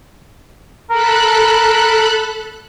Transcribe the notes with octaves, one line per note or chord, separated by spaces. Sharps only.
A4 A#4 B5 F#6